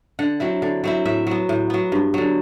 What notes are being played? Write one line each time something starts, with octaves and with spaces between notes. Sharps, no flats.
D3 F#5
F#3 C4 E4
D3
F#3 C4 E4
A2 E5
F#3 B3
A2
F#3 B3
G2
D3 F#3